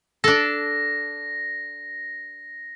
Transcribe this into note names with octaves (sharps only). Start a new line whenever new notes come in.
D4 A4 A#6